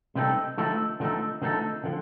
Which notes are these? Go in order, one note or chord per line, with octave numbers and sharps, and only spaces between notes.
C3 G3 C4 D#4 A4
D3 F3 A3 D#4 A4
D3 F3 A3 D#4 A4
D3 F3 A3 D#4 A4
D3 F3